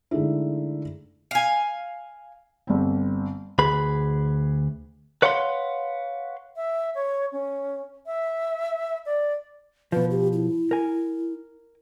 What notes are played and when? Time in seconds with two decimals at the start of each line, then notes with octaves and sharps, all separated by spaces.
0.11 D3 G#3 A3 D#4 E4
1.31 F5 G#5
2.67 G1 C4
3.59 D2 G#4 B4 B5
5.22 B4 C#5 F5 F#5 B5 C6
6.56 E5
6.94 C#5
7.32 C#4
8.06 E5
9.05 D5
9.92 B2 F3 B4
10.11 G4
10.33 E4
10.71 A#4 G#5